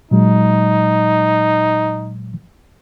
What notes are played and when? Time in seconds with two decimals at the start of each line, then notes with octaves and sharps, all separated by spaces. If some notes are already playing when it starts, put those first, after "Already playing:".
0.11 A#2 F#3 G#3 D#4